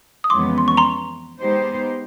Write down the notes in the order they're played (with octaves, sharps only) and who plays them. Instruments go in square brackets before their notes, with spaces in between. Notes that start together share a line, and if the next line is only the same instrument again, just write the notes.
[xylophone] D#6
[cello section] F2 C#3 E3 G#3 B3 [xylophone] C6 D6
[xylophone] C6
C#6
A#5 C6
[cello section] G#3 B3 D#4 G4 C5